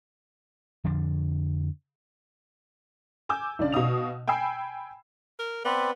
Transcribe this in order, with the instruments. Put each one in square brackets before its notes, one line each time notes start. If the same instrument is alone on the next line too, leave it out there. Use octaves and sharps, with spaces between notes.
[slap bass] F2 D3 F3 D4
[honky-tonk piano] G#5 D6 E6 G6
B1 C#3 D4 D5
B2 F5 D#6 F7
G5 G#5 B5 E6 C7
[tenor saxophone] A#4
[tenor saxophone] B3 [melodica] C4 B4 D5